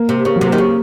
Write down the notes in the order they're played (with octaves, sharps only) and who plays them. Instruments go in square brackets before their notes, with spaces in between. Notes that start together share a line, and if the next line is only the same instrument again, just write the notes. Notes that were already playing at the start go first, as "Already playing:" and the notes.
Already playing: [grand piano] A#3
[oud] C3
[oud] C#3 [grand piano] A#3
[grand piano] F#3
[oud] C3
[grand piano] A#3
[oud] D#3
C#3